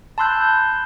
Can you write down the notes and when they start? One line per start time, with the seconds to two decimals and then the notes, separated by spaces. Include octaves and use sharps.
0.18 A5 B5 C6 E6 F#6 G6